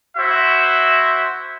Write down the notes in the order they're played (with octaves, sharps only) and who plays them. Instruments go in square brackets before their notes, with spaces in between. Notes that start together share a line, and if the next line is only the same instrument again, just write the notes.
[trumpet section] E4 F#4 C5 E5